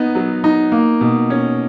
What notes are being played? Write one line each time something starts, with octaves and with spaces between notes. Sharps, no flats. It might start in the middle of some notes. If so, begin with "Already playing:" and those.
Already playing: B3 D#4
F#3
D#4
A#3
B2
C#4